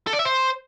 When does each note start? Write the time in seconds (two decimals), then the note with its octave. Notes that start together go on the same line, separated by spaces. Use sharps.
0.07 A4
0.13 D5
0.19 E5
0.25 C5